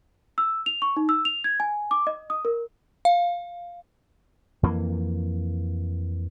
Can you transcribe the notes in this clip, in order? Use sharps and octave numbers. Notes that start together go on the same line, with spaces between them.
E6
F7
C#6
D#4
E6
F7
G#6
G#5
D6
D#5
D#6
A#4
F5
F2 E3 A#3